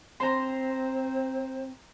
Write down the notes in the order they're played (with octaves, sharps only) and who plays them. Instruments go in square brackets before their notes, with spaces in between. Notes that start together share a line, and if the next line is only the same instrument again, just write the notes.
[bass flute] C4 [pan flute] C5 [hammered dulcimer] A#5 C6